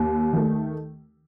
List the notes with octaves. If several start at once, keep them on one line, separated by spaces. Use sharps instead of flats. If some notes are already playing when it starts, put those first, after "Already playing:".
Already playing: D#2
D#3 A3